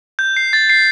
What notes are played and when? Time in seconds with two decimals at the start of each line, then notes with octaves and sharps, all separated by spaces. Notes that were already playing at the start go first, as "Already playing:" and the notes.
0.19 G6
0.37 C7
0.53 A6
0.69 C7